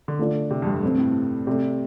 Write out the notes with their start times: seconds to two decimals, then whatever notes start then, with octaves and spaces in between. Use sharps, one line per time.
0.08 D3
0.19 D3 A3 D4 F4 D5
0.51 C3
0.62 F2
0.67 G2
0.83 G2 C3 A3 C4
0.98 A2
1.47 C3 A3 C4 A4 D5